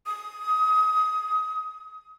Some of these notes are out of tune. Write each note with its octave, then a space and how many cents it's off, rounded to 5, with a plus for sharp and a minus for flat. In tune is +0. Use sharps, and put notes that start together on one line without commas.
D#6 +20